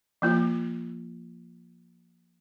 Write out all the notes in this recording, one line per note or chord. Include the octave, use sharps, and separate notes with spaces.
F3 A#3 F4